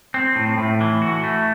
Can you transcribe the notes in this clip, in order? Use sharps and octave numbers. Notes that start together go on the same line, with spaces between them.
C4
A2
A2
E3
F#4
A3